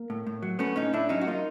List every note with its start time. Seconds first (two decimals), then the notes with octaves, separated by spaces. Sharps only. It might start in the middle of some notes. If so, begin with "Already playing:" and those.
Already playing: A#3
0.10 A2
0.27 A2
0.42 F#3
0.59 A3 B3 C#4
0.76 A2 C#4 D#4
0.93 A2 D4 E4
1.09 F#3 C#4 D#4
1.21 F#4
1.26 A#3 D#4 F4